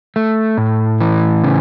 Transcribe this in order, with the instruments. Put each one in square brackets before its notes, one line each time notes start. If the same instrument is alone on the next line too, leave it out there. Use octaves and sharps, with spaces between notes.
[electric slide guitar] A3
A2
E3
C#3